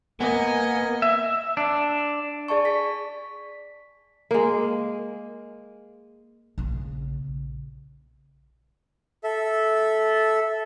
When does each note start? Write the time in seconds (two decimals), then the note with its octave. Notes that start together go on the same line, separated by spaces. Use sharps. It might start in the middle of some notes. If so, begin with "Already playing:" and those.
0.20 A#3 B3 D#5 G#5
1.02 E5
1.57 D4
2.48 G#4 D5 A5 C#6
2.65 B6
4.31 G#3 A#3
6.58 A#1 C#3
9.24 A4 E5